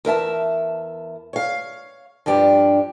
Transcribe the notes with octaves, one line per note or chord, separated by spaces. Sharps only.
E2 A#4 E5 A5
C#5 F5
G2 F3 D4 G4